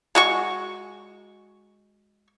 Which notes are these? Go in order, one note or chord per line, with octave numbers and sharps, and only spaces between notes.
G#3 F#4 C#6